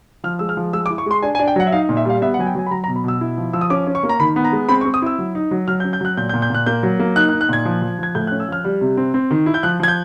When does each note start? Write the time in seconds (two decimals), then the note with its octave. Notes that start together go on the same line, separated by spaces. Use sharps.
0.24 F3 F6
0.39 G#3 E6
0.49 F6
0.57 F3
0.73 G#3 E6
0.86 D6
0.90 E4
0.98 C#6
1.06 G#3 C6
1.22 D4 G#5
1.35 G#5
1.39 D4
1.48 G5
1.56 F#3 F#5
1.67 E5
1.72 D#4 F5
1.89 A#2
1.97 E5
2.05 G3 F5
2.22 B3 E5
2.34 F#5
2.39 F#3 G#5
2.47 G5
2.55 F#3 G#5
2.66 B5
2.71 F#3 A#5
2.84 A#5
2.88 B2
2.96 B5
3.04 B2 E6
3.21 E4
3.37 F3
3.53 F3 E6
3.61 D#6
3.70 C#4 D6
3.87 C#4
3.95 C#6
4.03 A#3
4.09 A#5
4.19 D#3 B5
4.36 B3
4.44 A#5
4.52 G#3
4.69 C4 B5
4.81 C#6
4.85 C4
4.94 D#6
5.02 E4 E6
5.19 F#3
5.35 D#4
5.51 F#3
5.68 F#3 F6
5.80 G6
5.84 C#4
5.93 G6
6.01 F#3 F#6
6.17 A#2 G6
6.29 G6
6.34 A#2
6.42 G6
6.50 A#2 F#6
6.66 A#3 G6
6.83 F#3
7.00 A#3
7.16 D#4 F#6
7.29 F#6
7.33 D#4
7.41 F#6
7.49 A#2 G#6
7.65 F3
7.82 F3
7.99 F3 G#6
8.15 A2 G6
8.27 F#6
8.31 C#4
8.40 E6
8.48 F3 F6
8.64 G3
8.81 C3
8.97 C4
9.14 C4
9.31 D#3
9.46 E4
9.54 G6
9.63 F3 F#6
9.80 F3 G#6
9.88 G6